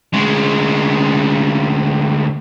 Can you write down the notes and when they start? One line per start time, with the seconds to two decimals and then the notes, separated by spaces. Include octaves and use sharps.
0.13 D2 G#3